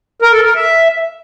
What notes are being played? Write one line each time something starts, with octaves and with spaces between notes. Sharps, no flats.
A#4
A4
A#4
E5